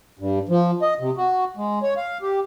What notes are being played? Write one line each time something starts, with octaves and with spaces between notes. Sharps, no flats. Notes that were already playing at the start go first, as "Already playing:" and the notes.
G2
F3
D#5
C3
F#4
G#3
C#5
F5
G4